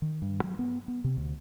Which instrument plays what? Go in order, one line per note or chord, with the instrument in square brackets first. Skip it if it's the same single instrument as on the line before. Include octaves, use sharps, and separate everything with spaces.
[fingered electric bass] D#3
G2
F#3
B3
B3
C3
D2